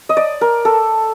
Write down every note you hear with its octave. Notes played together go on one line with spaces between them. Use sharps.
D#5
D5
A#4
A4